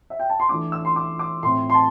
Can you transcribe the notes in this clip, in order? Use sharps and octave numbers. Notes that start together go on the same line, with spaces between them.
E5
G5
A5
C6
E3 A3 D4 D6
E6
C6
D6
D6
A2 A3 C4 C6
C6
A5